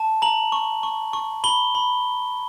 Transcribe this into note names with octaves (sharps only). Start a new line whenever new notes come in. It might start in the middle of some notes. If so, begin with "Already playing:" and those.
Already playing: A5
A#5 F#7
C#6
C#6
C#6
B5 G7
B5